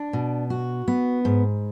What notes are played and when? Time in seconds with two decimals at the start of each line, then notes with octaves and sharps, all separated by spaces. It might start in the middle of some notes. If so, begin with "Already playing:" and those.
Already playing: D4
0.13 B2
0.50 F#4
0.88 B3
1.25 G#2